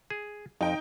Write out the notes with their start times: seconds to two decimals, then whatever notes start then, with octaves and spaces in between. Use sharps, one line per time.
0.10 G#4
0.61 F2 D#4 G5